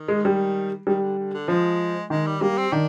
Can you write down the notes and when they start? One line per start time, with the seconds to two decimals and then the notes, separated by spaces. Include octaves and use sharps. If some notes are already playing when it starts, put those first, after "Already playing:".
Already playing: D#3
0.08 G#3
0.25 G3
0.86 D#3 G3
1.02 D3
1.18 D3
1.33 D3
1.48 F3 G#3
2.10 D#3 G#3
2.27 G3
2.41 G3 A#3
2.58 C4
2.72 D#3 D4